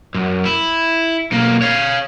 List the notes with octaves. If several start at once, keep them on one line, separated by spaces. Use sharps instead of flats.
F#2
E4
B1 A#3
C#5 F5